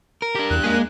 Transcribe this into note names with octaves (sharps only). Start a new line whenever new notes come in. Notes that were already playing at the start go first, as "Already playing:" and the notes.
A#4
D4 G4
E2 F#6
G#3 A#3 G#4